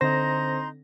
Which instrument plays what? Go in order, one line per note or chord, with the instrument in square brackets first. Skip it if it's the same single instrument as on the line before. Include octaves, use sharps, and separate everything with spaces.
[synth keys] D3 C4 A#6 [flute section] D#4 A#5 C6 [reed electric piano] C5